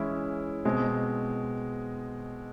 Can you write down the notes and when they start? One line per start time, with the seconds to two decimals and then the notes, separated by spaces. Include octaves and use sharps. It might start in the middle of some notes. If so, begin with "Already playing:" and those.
Already playing: E3 G#3 C#4 E4
0.65 B2 G#3 C4